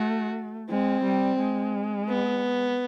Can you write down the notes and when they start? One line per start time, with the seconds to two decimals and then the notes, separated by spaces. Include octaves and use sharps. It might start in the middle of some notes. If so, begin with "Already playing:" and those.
Already playing: A3 F#4
0.70 G#3 C4
1.05 G3
1.39 G#3
2.09 B3